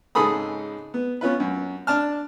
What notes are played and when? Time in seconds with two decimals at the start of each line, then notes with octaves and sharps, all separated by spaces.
0.15 C#2 G#2 G#4 A4 B5 D#6
0.94 B3
1.21 B3 C#4 F4 B4
1.40 F#2
1.87 D4 A5 F6